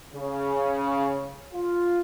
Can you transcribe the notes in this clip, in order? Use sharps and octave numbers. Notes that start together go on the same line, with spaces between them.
C#3
F4